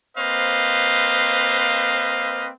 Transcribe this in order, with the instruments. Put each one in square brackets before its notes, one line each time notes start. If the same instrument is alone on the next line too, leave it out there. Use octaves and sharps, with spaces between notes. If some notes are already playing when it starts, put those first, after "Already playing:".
[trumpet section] A#3 C4 B4 C5 D#5 F5